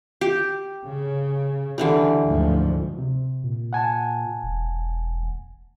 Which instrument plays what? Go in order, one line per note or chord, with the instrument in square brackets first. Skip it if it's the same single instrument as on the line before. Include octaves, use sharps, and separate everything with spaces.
[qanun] G4
[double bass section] C#3
[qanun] D3 E3 G3
[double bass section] D2 G#2 F3
[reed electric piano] C3
[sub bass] A#2
[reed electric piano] F#5 G#5 A5
[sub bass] E1